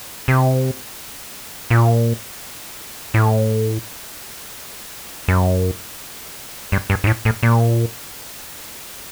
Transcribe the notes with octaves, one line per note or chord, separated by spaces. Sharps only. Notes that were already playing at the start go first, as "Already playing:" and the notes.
C3
A#2
A2
F#2
G2
G2
G2
A2
A2
A#2